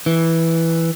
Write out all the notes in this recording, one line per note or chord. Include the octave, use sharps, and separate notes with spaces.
E3